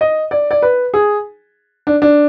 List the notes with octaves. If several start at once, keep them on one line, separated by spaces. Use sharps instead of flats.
D#5
D5
D5
B4
G#4
D4
D4